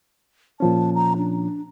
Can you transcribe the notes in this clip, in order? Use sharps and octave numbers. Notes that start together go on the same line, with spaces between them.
A#2 F3 C#4 A5
A#5
D4